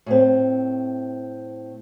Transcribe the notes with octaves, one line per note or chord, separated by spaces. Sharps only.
A2 C4